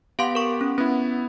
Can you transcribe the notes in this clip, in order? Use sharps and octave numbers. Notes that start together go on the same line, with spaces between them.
B3 G4 F5 F#5 C6 D7
A#4 C#6
C#4
B3 C#4 E4